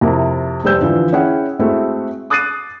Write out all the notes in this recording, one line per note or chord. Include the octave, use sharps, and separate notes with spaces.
F2 C3 E4 A#4
F1 G3 G4 C5 E6 G6
D3 E3 F3
C#4 E4 G#4 F#5 G5
G#3 A3 C4 E4 F#4 A4
D6 D#6 F#6 A6 C7 D#7